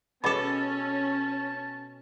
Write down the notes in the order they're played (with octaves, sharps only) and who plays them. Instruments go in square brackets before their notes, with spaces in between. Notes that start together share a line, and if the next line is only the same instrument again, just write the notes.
[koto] B2 A4 [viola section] C#4 [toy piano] G#4 D#5 B5 [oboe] A5